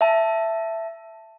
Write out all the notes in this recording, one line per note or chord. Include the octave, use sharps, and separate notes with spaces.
E5 A5